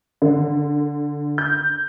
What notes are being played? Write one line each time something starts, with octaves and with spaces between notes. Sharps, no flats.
D3
G6